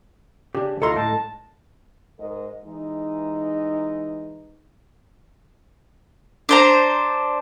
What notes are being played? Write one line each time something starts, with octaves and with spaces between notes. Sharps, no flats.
C#3 D4 G4
D2 E4 F4 A4 D#5 A#5 C6
A2 A5
G#2 A#4 D#5
E3 G#3 D#4
D4 C5 A#5